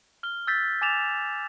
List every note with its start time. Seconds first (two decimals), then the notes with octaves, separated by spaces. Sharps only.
0.23 F6 G7
0.47 E6 G6 A6 B6
0.81 G#5 D6 A6 E7 F7